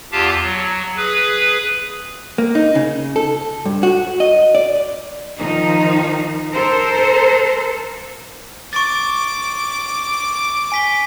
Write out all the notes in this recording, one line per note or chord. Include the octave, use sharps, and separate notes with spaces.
E2 F4 G4 F5 A5
F#3
G#4 B4
A#3
D#4
C#3
A4
G2
F#4
D#5
D5
D#3 F3 D#4
A4 A#4 C5
C#6 D6 A6
G#5 B6 G7